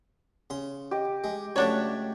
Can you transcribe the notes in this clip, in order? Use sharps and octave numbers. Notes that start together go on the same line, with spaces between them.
C#3 C6
G4 D#5
G#3
C#2 F#3 A3 D4 C#5